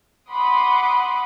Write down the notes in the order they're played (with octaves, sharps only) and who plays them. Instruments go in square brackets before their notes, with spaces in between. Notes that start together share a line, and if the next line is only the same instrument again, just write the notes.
[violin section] F#5 B5 C6 D6 D#6